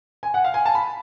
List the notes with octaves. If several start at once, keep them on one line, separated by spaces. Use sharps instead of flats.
G#5
F#5
F5
G#5
A5
B5